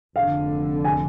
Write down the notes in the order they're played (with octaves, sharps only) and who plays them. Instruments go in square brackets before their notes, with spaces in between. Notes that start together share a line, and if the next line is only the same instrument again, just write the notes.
[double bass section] F1 F2 D3 [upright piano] F5
[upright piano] G#5